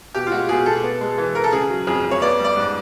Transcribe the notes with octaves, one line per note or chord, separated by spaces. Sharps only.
B2 G4
F4
G#3 F#4
B2 G#4
B2 A4
B3
G#3
E3
E3 A#4
A4
C#3 G#4
F#3
F2 G#4
F2
C#5
B3 D5
G3
D5
G#2